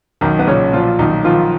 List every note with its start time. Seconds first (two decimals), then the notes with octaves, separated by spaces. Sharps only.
0.21 B1 D#3 D#4
0.39 B3
0.47 A#2 C#3 C#4
0.73 A#2 F3 F4
0.99 B1 D#3 D#4
1.24 D#3 F3 F4